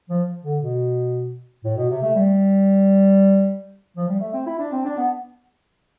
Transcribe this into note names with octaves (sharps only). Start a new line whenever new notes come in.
F3
D3
B2
A2
B2
C3
A3
G3
F3
G3
A3
C4
E4
D4
C4
D4
B3